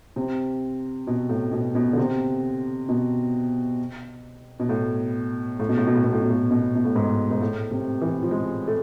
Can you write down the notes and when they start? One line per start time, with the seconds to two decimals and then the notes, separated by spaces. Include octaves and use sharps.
0.16 C3
1.07 B2
1.29 A2
1.52 B2
1.75 B2
1.93 D3
1.98 C3
2.89 B2
4.60 B2
4.69 A2
5.60 A2
5.69 B2
5.77 A2
5.87 B2
5.96 A2
6.04 B2
6.13 A2
6.22 B2
6.30 A2
6.51 B2
6.75 B2
6.85 A2
6.96 G#2
7.31 G#2
7.41 A2
7.71 C3
8.01 E3
8.23 F3
8.31 G#3
8.68 A3